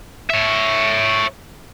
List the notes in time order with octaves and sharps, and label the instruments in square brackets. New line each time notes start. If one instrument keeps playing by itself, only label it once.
[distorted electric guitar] C#5 E5